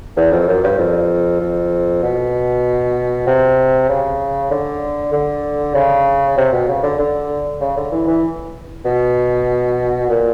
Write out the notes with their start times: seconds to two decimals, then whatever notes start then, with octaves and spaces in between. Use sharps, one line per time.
0.16 E2
0.32 F2
0.48 F#2
0.64 G2
0.79 F2
1.41 F2
2.03 B2
3.27 C3
3.89 C#3
4.51 D3
5.13 D3
5.74 C#3
6.37 C3
6.52 B2
6.68 C#3
6.83 D3
6.99 D3
7.61 C#3
7.77 D3
7.92 E3
8.07 E3
8.85 B2
10.09 A#2